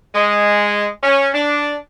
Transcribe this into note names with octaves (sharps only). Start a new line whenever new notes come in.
G#3
C#4
D4